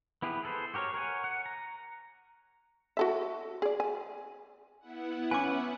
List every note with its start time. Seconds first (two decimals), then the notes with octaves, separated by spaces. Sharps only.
0.22 B3 E4 G4 G#4 B4
0.43 G#4 A4 B4 C5
0.74 F#4 G4 A#4 B4 C#5
0.94 A#4 C#5 F#5 G#5
1.24 F#5
1.46 A#5
2.97 F#4 A4 E5
3.62 G#4 D5
3.80 G#5
4.80 B3 E4 F#5
5.31 C#4 B4 G#5 D6